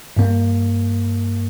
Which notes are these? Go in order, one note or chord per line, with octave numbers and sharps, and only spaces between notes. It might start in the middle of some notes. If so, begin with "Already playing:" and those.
G2 A#3